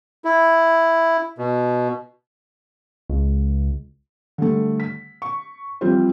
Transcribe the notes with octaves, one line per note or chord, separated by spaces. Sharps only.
E4
B2
C#2
D3 G3 A3
B6
C#6
E3 F3 G3 C4 F4 C5